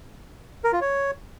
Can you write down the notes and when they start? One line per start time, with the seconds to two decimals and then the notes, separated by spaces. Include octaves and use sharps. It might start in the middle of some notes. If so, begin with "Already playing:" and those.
0.64 A#4
0.73 F4
0.81 C#5